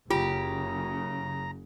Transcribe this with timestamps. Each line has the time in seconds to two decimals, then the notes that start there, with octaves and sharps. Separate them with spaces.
0.10 F#1 F#2 C#3 F4 G4 A#5